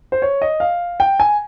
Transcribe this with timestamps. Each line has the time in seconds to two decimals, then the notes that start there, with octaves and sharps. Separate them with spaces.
0.12 C5
0.22 C#5
0.42 D#5
0.60 F5
1.00 G5
1.20 G#5